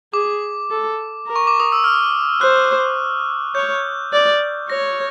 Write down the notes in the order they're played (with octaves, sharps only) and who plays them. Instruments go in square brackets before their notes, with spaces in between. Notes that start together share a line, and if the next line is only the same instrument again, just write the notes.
[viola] G#4 [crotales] D6
[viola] A4
A#4
[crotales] C#6
D6
D#6
E6
F6
[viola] C5 [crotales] F#6
[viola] C#5 [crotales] G6
[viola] D5
[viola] C#5 [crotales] A#6